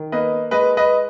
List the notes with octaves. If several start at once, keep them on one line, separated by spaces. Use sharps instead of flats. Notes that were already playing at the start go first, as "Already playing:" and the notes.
Already playing: D#3
A#3 B4 D#5
G#3 B4 D#5
B4 D#5